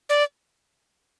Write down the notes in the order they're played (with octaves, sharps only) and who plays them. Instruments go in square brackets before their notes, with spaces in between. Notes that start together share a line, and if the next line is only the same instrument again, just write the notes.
[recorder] D5